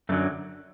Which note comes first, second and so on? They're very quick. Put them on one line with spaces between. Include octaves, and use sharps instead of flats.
F#2 A3 D3 F#3